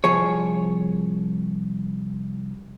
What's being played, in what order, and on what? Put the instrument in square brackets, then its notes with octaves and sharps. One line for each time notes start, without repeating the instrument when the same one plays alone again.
[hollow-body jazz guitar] C2 F3 G#4 C#5